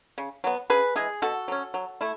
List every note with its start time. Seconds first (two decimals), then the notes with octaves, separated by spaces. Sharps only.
0.18 C#3
0.44 F#3 B3
0.70 C#3 G#4 B4
0.96 E3 G#3 G#4
1.22 B2 F#4 A4
1.48 F#3 C#4
1.74 F#3
2.01 A3 E4